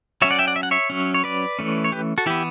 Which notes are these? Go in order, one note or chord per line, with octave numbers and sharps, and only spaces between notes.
F#3 C#4 C#5 E5
D5 F#5
E5 G5
D5 F#5
E5
F#5
C#5 E5
F#3 C#4
C#5
B4 D5
E3 A3 C#4
C#5
G4 B4
F#4 A4
E3 B3 E4 G4